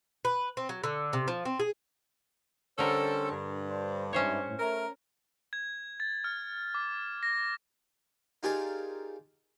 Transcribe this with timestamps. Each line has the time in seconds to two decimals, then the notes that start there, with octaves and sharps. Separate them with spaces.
0.25 B4
0.57 C4
0.69 F#3
0.84 D3
1.13 C3
1.28 F3
1.45 C4
1.60 G#4
2.79 D3 G3 C#4 A4 A#4 C5 A5
3.32 G2
3.69 D4 C5
4.13 G#2 C#4 E4 C5 C#5
4.47 A2
4.60 A3 A#4
5.53 G#6
6.00 A6
6.24 F6
6.74 D6
7.23 A#6
8.43 D#4 F4 G4 G#4 A#4 D5